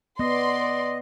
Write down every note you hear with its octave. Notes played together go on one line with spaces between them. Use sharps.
B3 D5 D#5 C6